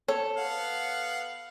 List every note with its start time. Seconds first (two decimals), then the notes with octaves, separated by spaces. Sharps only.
0.08 A4 C#5
0.37 B3 F5 F#5